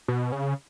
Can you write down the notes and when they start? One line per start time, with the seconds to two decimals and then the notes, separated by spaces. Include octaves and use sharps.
0.08 B2
0.32 C#3